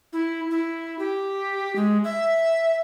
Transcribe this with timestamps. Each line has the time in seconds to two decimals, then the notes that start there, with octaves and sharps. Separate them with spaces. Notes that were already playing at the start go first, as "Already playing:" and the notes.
0.13 E4
0.51 E4
0.99 G4
1.76 G#3
2.04 E5